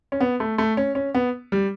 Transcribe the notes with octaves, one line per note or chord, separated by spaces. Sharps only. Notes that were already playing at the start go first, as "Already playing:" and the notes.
C#4
B3
A3
A3
C#4
C#4
B3
G3